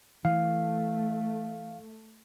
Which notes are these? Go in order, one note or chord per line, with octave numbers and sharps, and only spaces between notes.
E3 A3 F5